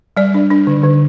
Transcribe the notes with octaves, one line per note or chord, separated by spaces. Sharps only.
G3 D5
D4
D4
D3
D3